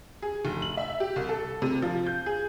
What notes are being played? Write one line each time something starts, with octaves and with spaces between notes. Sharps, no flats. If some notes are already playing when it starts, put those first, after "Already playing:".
G#4
F1
F#7
E5
G4
C2
A4
C3
F3
G6
G#4